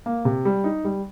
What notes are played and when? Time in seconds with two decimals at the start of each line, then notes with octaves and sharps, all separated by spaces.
0.06 A#3
0.25 C3
0.45 G3
0.64 D#4
0.85 G3